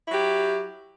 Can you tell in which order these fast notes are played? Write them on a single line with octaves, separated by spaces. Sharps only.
E4 F#3 G4